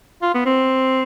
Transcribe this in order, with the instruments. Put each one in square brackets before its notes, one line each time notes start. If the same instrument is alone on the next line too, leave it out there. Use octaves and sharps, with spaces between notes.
[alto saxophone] F4
B3
C4